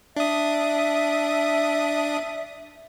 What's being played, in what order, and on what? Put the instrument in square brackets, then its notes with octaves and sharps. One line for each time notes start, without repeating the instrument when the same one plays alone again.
[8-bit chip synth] D4 D#6 [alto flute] E5